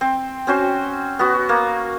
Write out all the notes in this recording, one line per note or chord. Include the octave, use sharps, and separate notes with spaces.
C4
C4 C#4 F#4 C5
B3 F#4
A#3